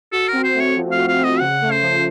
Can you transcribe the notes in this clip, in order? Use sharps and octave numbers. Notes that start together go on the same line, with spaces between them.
F#4 A4
C4 A#4
C5
A3
C#5
F3
F5
F#4
F5
C4
D#5
C#3 F#5
A3
C5
F3